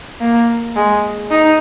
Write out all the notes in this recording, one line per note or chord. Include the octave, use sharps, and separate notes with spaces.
A#3
G#3
D#4